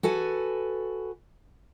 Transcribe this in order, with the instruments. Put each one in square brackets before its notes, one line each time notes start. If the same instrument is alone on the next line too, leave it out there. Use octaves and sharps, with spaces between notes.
[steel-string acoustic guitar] F#4 A4 B4 G#5